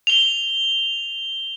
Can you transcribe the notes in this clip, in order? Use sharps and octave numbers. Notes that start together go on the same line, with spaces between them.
F7 G7